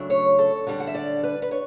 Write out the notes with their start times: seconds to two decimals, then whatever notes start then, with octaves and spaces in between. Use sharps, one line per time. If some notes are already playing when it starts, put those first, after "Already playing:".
Already playing: C#3 F#3 A3 D4
0.10 C#5
0.39 A4
0.67 D3 G3 D4
0.80 F#5
0.87 E5
0.95 D5
1.23 B4
1.42 B4
1.51 C#5